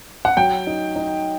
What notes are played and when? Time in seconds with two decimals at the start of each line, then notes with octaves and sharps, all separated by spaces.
0.25 F#5
0.37 F#3 G5
0.67 D#4
0.96 D#4